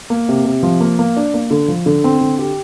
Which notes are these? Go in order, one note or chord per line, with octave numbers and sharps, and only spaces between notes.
A#3
C3
C3
F3
A#3
A#3
D4
A#3
D3
F3
D3
C4
D3
G4